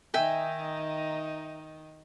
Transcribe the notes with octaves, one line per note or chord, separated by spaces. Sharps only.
D#3 D#4 E5 G5 G#5